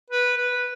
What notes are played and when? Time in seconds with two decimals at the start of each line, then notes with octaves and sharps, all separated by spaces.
0.10 B4
0.37 B4